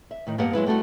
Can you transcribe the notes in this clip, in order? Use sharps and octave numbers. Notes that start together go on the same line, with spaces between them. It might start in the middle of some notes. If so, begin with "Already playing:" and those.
E5
A2 D#3
G2 A#3 B3 G4 F#5
F#3 G#3 E4 B4
G3 A3 E4 F#4